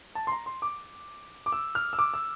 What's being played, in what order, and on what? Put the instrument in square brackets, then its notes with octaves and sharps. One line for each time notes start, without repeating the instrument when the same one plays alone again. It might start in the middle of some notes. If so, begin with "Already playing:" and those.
[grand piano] A5
C6
A#5
C6
D6
D6
E6
F6
E6
D6
E6